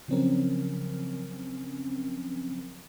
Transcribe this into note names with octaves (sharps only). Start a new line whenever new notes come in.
C#3 F3 F#3 C4 C#4 A#4